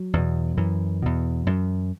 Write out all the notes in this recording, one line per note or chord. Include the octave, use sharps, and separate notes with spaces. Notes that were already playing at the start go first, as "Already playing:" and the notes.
Already playing: F#3
E2 B2
F#2 E3
E2 B2
F#2